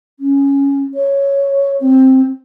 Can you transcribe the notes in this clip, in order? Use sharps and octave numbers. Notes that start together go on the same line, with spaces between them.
C#4
C#5
C4